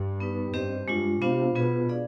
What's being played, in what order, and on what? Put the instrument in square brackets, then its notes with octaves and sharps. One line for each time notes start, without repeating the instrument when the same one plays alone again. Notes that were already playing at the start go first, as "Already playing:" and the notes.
Already playing: [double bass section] G2
[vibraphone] B3 D#4 B4
[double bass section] G2 [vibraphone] C4 G4 C5 D#5
[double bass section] G2 [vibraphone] G#3 D4 F4
[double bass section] C3 [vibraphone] B3 D4 F4 C5 F5
[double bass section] B2 [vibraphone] B3 F4 G#4 B4
[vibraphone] D4 G#4 D5 F5